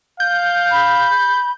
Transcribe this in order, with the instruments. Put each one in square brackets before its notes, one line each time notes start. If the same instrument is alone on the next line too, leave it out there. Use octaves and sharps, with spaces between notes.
[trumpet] F5 [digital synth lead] G6
[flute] B5